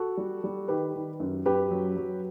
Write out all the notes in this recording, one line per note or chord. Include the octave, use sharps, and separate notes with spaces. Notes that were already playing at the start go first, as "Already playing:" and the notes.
Already playing: F#4 A4
G3
G3
D#3 G4 B4
D#3
F#2
F#2 G4 B4
F#3
F#3